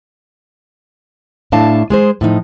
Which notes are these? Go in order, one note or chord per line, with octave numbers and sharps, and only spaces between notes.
A2 A3 D4 F5 A5
G#3 G#4 C5
A2 F3 D#4